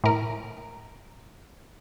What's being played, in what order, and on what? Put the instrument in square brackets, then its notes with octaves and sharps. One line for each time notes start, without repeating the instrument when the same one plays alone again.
[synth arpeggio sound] A2 A#4